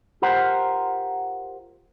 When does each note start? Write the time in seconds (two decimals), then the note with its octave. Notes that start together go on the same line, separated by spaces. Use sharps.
0.22 F4 G4 A#4 C5 F#5